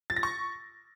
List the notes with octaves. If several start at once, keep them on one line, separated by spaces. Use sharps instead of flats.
A6
A#6
C#6